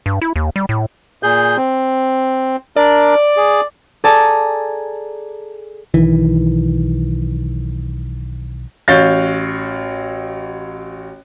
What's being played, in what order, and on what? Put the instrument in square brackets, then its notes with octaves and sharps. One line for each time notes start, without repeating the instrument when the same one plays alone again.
[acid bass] G2
E4
D#2
G3
A2
[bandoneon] A#2 G#4 G6
C4
[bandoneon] D4 A#4 [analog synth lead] D5
[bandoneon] G#4
[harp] G#4 A4 D5 A5 A#5
[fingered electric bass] B1 D#3 E3
[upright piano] A1 F#4 C#5 F5 G6 A6